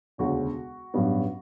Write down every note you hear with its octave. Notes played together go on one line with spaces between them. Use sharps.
E1 D2 C#3 F#4
A1 G2 F#3 B3